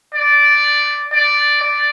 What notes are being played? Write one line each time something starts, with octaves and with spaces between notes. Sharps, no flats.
D5
D5
D5